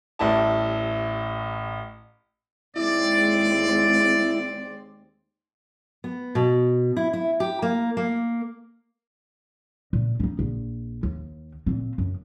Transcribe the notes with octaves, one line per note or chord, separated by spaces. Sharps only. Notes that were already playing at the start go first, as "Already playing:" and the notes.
A1 A2 G3 E4 A5
D#2 G#3 C4 E4 D5
B3
B2
E4
E4
G4
A#3
A#3
A#2
D4 D#4
A#1
D#2
A#2 C4
F#2